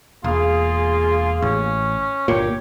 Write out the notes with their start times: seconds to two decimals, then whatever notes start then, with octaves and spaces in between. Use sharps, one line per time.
0.24 E1 A#3 F4 G#4
1.42 A1 C#4
2.28 G1 A#2 G4 C#5